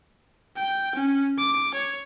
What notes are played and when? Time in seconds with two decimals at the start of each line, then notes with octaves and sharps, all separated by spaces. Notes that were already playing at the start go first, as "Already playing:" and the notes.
0.56 G5
0.95 C#4
1.38 D6
1.74 C#5